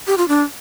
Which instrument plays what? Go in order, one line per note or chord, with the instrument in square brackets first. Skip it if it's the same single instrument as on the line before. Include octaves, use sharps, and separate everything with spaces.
[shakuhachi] G4
F4
D4